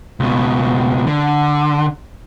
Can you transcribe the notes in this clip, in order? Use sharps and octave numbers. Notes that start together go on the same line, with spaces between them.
C#2 B2
D3